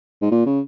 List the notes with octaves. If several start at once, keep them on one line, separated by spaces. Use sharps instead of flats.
G#2
A#2
C#3